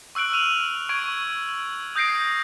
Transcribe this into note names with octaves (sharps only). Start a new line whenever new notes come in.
C#6 E6 F#6 D7 F#7
F6 D#7 F7 F#7
C#6 G#6 D7
F#7
D#6 G6 A#6 C7 D7